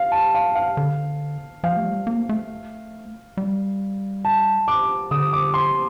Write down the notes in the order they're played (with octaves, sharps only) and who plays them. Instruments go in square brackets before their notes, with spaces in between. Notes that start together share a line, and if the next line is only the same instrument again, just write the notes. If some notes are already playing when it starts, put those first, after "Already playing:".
Already playing: [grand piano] F5
A5
F5
F5
[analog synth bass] D3
[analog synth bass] F3 [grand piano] F5
[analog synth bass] A3
G3
A#3
A3
G3
[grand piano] A5
D6
[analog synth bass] D3 [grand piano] D#6
[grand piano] D6
C6